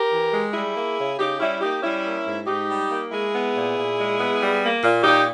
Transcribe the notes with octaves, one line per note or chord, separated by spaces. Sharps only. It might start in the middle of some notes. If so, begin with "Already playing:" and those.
Already playing: G4 A#4
E3
G#3
G3 E4 G#4
A#3
C#3
C#3 D#4 G4
G3 C#4 E4
A#3 D#4 G4
G3 C#4 E4
A#3
G#2
G#2 D#4 G4
G3
A#3
G#3 E4 G#4
B3
A#2
A#2
G#3
B3
G3
A#3
A#2
A#2 D#4 G4